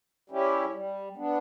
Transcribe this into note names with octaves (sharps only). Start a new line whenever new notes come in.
G3 C#4 E4 G4
G3
B3 D4